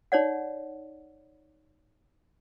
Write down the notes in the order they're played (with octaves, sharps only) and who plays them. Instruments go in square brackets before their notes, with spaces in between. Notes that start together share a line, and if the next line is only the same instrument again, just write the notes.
[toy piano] D#4 C#5 D5 F#5